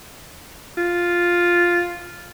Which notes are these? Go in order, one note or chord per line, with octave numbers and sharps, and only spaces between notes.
F4